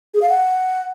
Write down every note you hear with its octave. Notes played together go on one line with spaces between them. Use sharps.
G#4
F5
F#5